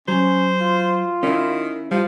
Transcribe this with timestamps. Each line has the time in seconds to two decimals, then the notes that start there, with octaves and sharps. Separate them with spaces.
0.08 F#3 C#4 C5
0.60 F4
1.23 D#3 C#4 E4
1.91 F3 G3 F4